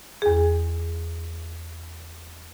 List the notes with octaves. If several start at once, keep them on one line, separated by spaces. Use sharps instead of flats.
E2 G#4